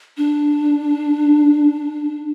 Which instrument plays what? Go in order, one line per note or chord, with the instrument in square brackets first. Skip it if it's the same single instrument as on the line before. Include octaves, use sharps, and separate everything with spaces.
[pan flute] D4